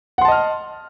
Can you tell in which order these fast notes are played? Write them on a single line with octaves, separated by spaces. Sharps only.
F#5 C6 A5 D#5 F6